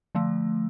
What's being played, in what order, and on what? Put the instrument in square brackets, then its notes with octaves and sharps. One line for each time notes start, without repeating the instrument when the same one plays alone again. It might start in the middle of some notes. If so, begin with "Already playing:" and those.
[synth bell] D3 F3 A3